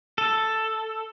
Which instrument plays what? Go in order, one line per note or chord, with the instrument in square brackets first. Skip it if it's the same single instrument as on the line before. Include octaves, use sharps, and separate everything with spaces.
[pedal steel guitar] A4